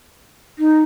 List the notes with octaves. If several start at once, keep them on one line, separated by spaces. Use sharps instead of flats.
D#4